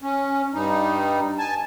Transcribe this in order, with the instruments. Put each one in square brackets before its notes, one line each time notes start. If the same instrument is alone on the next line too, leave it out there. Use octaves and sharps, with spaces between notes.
[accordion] C#4
G2 G3 D#4
G#5 A5